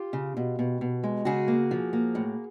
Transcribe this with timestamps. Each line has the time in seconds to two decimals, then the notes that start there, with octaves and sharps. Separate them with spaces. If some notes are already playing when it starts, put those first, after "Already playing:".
Already playing: F4 G4
0.13 C#3
0.37 B2
0.59 B2
0.81 B2
1.04 G#3
1.25 C#3 F#4 G#4
1.48 A#3
1.71 F3
1.93 A#3
2.15 A2